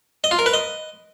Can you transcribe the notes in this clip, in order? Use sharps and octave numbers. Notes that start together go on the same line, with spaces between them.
D#5
F4
A#4
B4
D#5